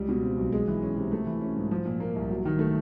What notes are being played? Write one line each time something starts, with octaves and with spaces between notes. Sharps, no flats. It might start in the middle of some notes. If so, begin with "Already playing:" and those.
Already playing: C#2 G3
B2
C4
B1
G#3
E3
C#4
C3
A3
E3
C#4
G#2
F3
A#2
A#3
C2
F#3
D#3
A3